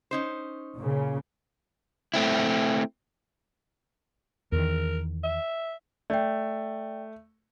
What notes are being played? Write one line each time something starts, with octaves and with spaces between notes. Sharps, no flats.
C#4 D#4 C5
A#2 C#3
A3 C4 E4
E2 D#3 A#4
E5
A3 D5 G5